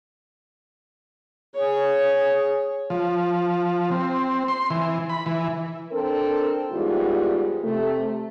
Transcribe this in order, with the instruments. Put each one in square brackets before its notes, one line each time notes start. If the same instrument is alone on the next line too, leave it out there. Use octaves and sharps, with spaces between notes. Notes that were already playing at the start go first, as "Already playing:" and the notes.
[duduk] G#4 [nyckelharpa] C#5
[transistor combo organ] F3
C4
C6
E3
B5
E3
[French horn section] C4 D4 A4 A#4
E2 G#2 G3 F4 G#4
C3 A3